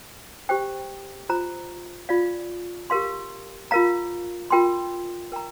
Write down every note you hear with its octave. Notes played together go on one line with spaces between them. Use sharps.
G4 C5 G5
F4 C5 A#5
F4 D5 F5
G4 A#4 F5 C6
F4 A#4 F5 A#5
F4 A#4 G5 C6
A#4 G5 A#5